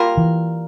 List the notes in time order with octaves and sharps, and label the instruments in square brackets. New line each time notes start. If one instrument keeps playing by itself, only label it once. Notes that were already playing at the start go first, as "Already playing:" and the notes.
Already playing: [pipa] G3 A#3 F4 A#4
[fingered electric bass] E3